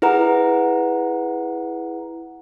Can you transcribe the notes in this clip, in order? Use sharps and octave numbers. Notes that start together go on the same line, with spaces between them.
E4 G#4 B4 F#5 A#5